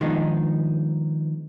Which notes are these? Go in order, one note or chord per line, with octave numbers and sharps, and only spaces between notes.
D#3 F3 G#3 B3 D4 D#4